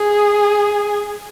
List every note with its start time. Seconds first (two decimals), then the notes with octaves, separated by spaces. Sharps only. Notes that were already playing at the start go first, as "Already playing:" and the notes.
Already playing: G#4